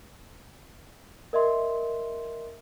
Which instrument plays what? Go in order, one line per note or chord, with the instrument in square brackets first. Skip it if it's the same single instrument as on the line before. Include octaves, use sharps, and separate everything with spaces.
[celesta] A#4 D#5 E5 C6